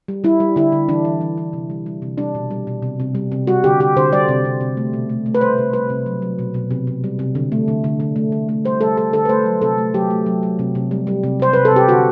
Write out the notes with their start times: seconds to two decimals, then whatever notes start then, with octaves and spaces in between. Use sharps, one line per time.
0.08 G3
0.24 G3 E4
0.40 G3
0.56 D3 E4
0.72 D3
0.89 E3 D4
1.05 E3
1.21 E3
1.38 E3
1.53 C3
1.70 G3
1.86 G3
2.02 C3
2.18 G3 D4
2.35 B2
2.51 G3
2.67 B2
2.82 C3
3.00 C3
3.15 G3
3.32 C3
3.47 G3 F#4
3.64 D3 G4
3.80 D3 G4
3.97 D3 C5
4.12 G3 D5
4.29 C3
4.45 C3
4.61 C3
4.77 A3
4.93 B2
5.10 A3
5.26 A3
5.35 B4
5.41 G3 C5
5.58 C3
5.73 G3 B4
5.89 C3
6.06 F#3
6.22 F#3
6.39 B2
6.54 B2
6.71 C3
6.87 C3
7.04 G3
7.19 C3
7.35 D3
7.52 A3
7.68 D3
7.84 D3
8.00 D3
8.16 A3
8.32 D3
8.49 A3
8.65 G3 C5
8.81 G3 A4
8.97 G3 A4
9.13 D3 A4
9.25 B4
9.29 A3 C5
9.46 F#3
9.62 C3 A4
9.78 A3
9.94 F#3 G4
10.10 A3
10.26 F#3
10.43 F#3
10.59 C3
10.75 C3
10.91 G3
11.07 G3
11.23 C3
11.40 C3 C5
11.53 C3 B4
11.65 A4
11.71 C3 G4
11.88 D3 F#4